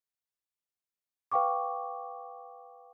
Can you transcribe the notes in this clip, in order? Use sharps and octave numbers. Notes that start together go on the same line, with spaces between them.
B4 F5 G5 C#6 D6